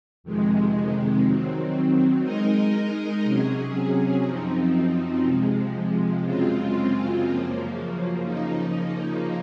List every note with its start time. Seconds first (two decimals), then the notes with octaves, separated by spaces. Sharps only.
0.24 F2 C3 D#3 G#3
1.24 D#3 F#3 C4
2.24 G#3 D#4 A#4 D#5
3.24 C3 F#3 C#4 G#4
4.24 F#2 F3 C4 D#4
5.24 C3 F3 G#3
6.24 F#2 C#3 G#3 C4 F4
7.24 F#2 C#3 F3 A#3
8.24 C#3 F3 A#3 D#4